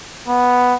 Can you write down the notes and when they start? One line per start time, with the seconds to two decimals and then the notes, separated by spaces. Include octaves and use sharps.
0.27 B3